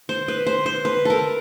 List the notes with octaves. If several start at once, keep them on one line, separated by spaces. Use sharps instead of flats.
C5
B4
C5
C5
B4
A4 A#4